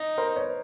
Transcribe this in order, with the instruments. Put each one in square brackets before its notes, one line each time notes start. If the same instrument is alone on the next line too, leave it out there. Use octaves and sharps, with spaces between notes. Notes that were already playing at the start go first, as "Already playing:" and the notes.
Already playing: [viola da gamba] D#4
[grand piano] A#4 C5
B4 C#5